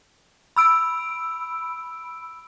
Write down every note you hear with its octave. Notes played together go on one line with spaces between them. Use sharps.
B5 E6 D7